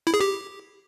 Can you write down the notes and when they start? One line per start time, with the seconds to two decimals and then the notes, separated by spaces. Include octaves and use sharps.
0.07 E4
0.14 G#4
0.20 G4